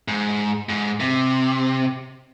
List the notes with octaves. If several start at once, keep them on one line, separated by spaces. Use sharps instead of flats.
G#2
G#2
C3